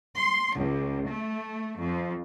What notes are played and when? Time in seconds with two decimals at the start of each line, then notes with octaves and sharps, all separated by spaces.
0.18 C6
0.56 C#2
1.09 A3
1.82 F2